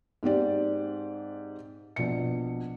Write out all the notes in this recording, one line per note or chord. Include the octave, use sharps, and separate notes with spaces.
G#2 C4 G4 D5
A#1 B2 C#7